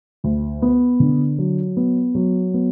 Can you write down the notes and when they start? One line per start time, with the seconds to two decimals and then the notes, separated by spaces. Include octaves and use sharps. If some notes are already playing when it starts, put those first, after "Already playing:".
0.24 D2
0.62 B3
1.00 D3
1.39 F#3
1.77 B3
2.15 F#3
2.54 B3